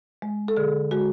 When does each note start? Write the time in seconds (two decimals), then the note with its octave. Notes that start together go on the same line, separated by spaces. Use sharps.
0.22 G#3
0.48 A4
0.57 D3 G#4
0.91 G#3 F#4